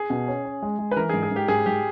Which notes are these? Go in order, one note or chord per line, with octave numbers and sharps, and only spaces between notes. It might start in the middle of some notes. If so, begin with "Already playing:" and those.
Already playing: G#4
B2
C#4
C#4
G#3
G#3
B4
E3 A#4
G#2 G#4
G#4
G#2 G4
G#2 G#4
G#2 G4